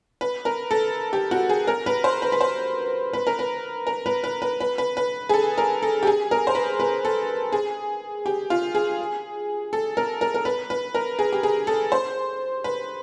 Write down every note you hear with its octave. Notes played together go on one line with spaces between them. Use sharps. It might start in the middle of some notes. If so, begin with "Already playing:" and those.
B4
A#4
A4
G4
F#4
G#4
A#4
B4
C5
B4
B4
C5
B4
A#4
B4
A#4
B4
B4
B4
B4
B4
B4
G#4
A4
A#4
A4
G4
G#4
A#4
C5
B4
B4
A4
G#4
G4
F4
G#4
A4
A#4
A#4
A#4
B4
B4
A#4
G#4
G4
G#4
A4
C5
B4